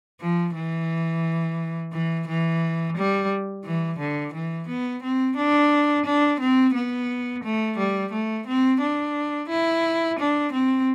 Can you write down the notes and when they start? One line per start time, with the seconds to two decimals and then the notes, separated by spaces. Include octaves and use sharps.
0.21 F3
0.55 E3
1.93 E3
2.28 E3
2.97 G3
3.65 E3
3.99 D3
4.33 E3
4.68 B3
5.03 C4
5.37 D4
6.05 D4
6.40 C4
6.74 B3
7.44 A3
7.78 G3
8.12 A3
8.47 C4
8.82 D4
9.50 E4
10.19 D4
10.53 C4